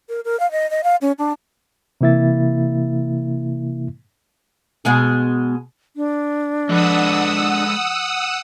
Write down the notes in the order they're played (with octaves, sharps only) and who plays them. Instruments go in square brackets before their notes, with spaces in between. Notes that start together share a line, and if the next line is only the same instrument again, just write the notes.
[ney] A#4
A#4
F5
D#5
D#5
F5
C#4
D4
[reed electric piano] C3 E3 A#3 E4 E5 A6
[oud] B2 G#3 G#4
[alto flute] D4
[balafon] F3 [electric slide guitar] G#3 A4 B4 [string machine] F#5 D#6 E6